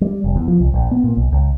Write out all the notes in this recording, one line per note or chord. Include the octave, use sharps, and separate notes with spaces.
G3
F1
E2
F3
C2
A#1
B3
A#2
B1
C#2